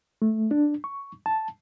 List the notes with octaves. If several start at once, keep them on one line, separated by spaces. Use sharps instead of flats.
A3
D4
C#6
A5